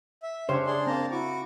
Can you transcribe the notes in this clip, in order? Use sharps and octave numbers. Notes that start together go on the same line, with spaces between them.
E5
C#3 D4 G4 C5 C#5
G#4 D5 C6
A#3 C4 A5 A#5
E4 F#4 C#6 D6